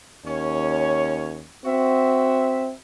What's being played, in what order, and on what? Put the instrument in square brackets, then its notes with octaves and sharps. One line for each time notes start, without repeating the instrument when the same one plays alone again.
[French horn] D#2 [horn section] C#4 C#5
[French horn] C4 [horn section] F#4 E5